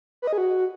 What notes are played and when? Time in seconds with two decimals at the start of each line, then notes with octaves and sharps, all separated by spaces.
0.22 B4
0.27 D#5
0.33 G#4
0.38 F#4